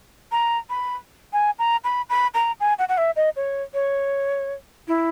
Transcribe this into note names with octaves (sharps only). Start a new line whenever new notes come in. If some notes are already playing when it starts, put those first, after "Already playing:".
A#5
B5
G#5
A#5
B5
B5
A#5
G#5
F#5
F#5
E5
D#5
C#5
C#5
E4